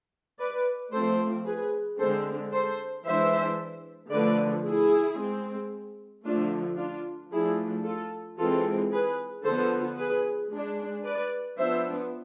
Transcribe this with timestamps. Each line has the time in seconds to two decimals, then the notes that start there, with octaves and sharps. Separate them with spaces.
0.39 B4 D5
0.92 F3 A3 C4 A4 C5
1.45 G#4 B4
1.99 D3 G#3 C4 A4 C5
2.52 A4 C5
3.05 E3 G#3 D4 C5 E5
4.12 D3 F3 A3 B4 D5
4.65 E4 G#4
5.18 G#3 C4
6.24 D3 F3 A3 D4 F4
6.78 D4 F4
7.32 F3 A3 D4 E4 G#4
7.85 F4 A4
8.38 E3 G#3 C4 F4 A4
8.91 G#4 B4
9.44 D3 F3 B3 A4 C5
9.98 G#4 B4
10.52 G#3 D4
11.04 B4 D5
11.57 F3 B3 D4 C5 E5